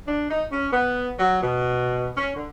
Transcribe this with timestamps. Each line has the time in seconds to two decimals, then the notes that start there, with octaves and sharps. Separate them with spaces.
0.06 D4
0.30 D#4
0.52 C#4
0.72 B3
1.18 F#3
1.43 B2
2.17 C#4
2.36 D3